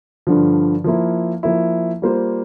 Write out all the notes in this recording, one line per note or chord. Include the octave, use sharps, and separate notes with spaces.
G2 D3 F3
F3 A#3 E4
F3 A#3 E4
G3 A#3 F4 C5